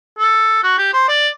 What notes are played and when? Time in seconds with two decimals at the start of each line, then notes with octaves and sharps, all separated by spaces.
0.19 A4
0.64 F#4
0.78 G4
0.94 C5
1.09 D5